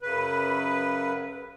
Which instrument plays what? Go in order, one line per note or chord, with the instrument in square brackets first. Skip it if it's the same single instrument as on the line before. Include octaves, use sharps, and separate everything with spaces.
[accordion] F#2 C#3 B4